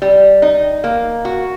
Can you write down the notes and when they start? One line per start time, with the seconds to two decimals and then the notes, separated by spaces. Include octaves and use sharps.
0.02 G3
0.42 D#4
0.84 A#3
1.25 F#4